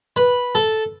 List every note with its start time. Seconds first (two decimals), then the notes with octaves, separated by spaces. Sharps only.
0.16 B4
0.55 A4